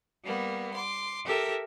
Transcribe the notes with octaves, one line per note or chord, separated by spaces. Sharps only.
G3 A#3 B3
C6 D6
G4 A4 A#4 E5